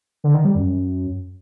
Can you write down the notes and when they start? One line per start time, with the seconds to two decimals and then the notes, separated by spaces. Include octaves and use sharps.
0.24 D3
0.34 D#3
0.45 G3
0.55 F#2